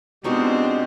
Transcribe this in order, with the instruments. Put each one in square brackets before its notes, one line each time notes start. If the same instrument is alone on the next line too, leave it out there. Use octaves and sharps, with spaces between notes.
[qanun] B2 D#4 C#6 [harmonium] G#3 G4 [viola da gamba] C4 D4 F4